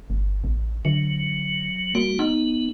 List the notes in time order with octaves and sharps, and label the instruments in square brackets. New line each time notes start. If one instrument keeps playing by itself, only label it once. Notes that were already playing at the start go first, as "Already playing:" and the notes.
[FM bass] G1
A1
[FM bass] D3 [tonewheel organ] F#3
[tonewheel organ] G3 F#4 [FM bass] A#3
[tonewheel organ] B3 [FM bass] D#4